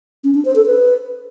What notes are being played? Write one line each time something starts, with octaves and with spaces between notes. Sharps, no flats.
C#4
D4
C5
A4
B4